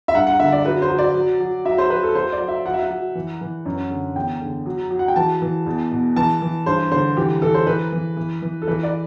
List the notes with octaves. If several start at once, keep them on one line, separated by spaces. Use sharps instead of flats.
E5
G2 F#5
F#5
D3 E5
D5
F#3 B4
C5
F#3
D5
F#3
F#3
F#3 E5
C5
F#3 B4
A4
F#3 C5
D5
F#3
E5
F#3 F#5
E5
F#5
F#3
E3
E3
F#2
D3
E2 G5
D3
F#3
F#3
F#5
G5
E3 A5
E3
E2
B2
E3 A5
E3
G2 C5
D3 C5
E3 G4
E3 A4
C5
E3 B4
E3
E3
E3
A4
E3 B4
D5